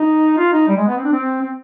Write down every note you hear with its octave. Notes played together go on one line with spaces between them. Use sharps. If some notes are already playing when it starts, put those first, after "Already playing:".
Already playing: D#4
F4
D#4
G3
G#3
B3
C4
D4
C4
C4